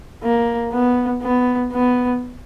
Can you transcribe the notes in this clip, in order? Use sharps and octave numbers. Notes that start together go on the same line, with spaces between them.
A#3
B3
B3
B3